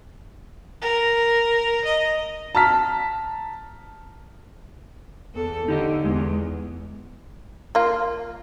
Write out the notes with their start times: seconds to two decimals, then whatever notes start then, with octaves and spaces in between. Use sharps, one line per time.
0.82 A#4
1.85 D#5
2.55 A5 A#5 F6 B6
5.35 E2 A4
5.68 D3 D#4 G4 D#5
6.05 E2 G#3
7.75 A#3 F4